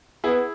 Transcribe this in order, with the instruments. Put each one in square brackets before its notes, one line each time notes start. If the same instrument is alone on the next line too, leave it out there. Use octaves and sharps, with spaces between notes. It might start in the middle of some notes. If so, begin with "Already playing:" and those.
[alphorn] B3 [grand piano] E4 G#4